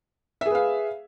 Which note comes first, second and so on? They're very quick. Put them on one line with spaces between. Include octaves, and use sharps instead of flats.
E5 G#4 B4 F5